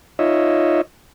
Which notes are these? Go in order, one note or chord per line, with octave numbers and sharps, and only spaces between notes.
D#4 F4 C#5 D#5 E5